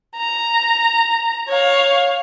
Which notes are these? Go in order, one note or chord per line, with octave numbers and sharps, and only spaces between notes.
A#5
C#5 F5